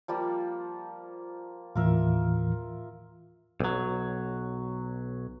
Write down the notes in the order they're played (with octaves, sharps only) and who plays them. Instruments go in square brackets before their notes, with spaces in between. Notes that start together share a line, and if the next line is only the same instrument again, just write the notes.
[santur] F3 G3 A#3
[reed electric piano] D#2 A2 E3 [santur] F4 A#4 E5
[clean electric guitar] B1 F#3